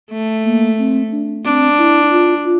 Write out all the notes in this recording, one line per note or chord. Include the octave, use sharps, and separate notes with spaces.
A3
A#3
C4
D4
C4 D4
E4
F4
F4